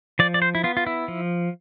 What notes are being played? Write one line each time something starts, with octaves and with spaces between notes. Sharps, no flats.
F3 D5
D5
C5
E4
B3 F4
F4
E4
F3